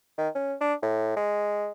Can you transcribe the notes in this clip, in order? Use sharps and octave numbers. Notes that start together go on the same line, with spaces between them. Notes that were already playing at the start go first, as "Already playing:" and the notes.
D#3
C#4
D4
A2
G#3